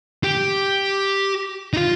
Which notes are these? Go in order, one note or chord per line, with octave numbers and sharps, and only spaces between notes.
G4
D#4
F4